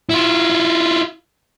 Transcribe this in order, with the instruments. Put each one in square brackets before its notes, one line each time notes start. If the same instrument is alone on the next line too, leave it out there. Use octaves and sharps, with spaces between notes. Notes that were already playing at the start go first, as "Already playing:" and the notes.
[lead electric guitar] E4 F4